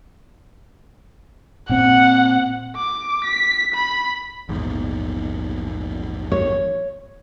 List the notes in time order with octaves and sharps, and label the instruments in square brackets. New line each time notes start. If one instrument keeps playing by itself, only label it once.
[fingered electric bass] A#2 C4 [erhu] F#5
[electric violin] D6
B6
B5
[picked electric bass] A#1 E2 G#2
[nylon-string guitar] C#5